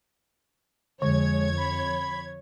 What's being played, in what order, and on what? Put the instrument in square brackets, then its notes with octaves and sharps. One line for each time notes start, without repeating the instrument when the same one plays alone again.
[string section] F2 C#5 G#6 [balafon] D3 [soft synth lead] G#3
[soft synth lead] B5